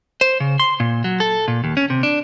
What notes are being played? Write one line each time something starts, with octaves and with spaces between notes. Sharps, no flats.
C5
C#3
C6
A#2
F#3
A4
A#2
D#2
C#4
C3
D4